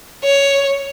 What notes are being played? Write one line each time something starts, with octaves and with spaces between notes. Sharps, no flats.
C#5